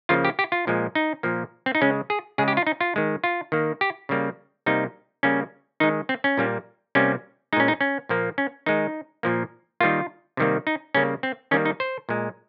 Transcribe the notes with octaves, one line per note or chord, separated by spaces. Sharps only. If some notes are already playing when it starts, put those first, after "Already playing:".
C#3 F3 A#3 F4
G4
G4
F4
A#2 F3 G#3
D#4
A#2 F3 A#3
C4
D#4
C#3 G#3 C#4
G#4
C#3 G#3 G#4
G4
F4
D#4
F4
D#3 G#3
F4
D#3 A#3
G4
C#3 G3 A#3
C3 G3 A#3 D#4
C#3 G3 A#3 C#4
D#3 G#3 D#4
C4
C#4
A#2 G3 A#3
C3 G3 A#3 C#4
A#2 G#3 C#4 D#4
D#4
C#4
A#2 F3 A#3
C#4
D#3 G#3 D#4
A#2 F3 A#3
D#3 G3 A#3 F4
C3 D#3 G3 A#3
D#4
C#3 G3 A#3 C#4
C4
D#3 G3 A#3 C#4
D#4
C5
A#2 G#3